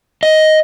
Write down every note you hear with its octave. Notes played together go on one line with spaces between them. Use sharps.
D#5